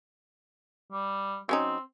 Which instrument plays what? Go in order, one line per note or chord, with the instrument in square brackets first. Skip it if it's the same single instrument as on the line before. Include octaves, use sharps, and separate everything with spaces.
[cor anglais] G3
[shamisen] F#3 C#4 D#4 [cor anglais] C4